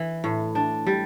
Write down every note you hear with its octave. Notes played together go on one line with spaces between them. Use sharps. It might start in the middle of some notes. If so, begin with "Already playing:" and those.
Already playing: E3
A2
D4
G3